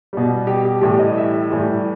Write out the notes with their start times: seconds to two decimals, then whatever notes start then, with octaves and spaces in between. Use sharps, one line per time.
0.13 B2 G3
0.47 G4
0.65 G4
0.81 A2 E3 G3 G4
0.99 D#5
1.17 E5
1.50 A2 E3 G3